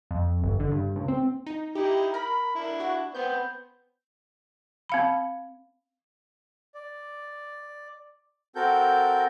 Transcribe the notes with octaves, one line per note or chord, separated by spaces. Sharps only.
F2
G1
D3
G2
C#2
C4
D#4
D#4 E4 G4
A#4 B5
D4 E4
F#4
B3 C4 G6
C4 F5 B5
D5
C4 F#4 A4 A#4 G6